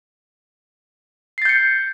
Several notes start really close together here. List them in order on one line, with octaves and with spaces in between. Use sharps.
C7 A6 G6 C#7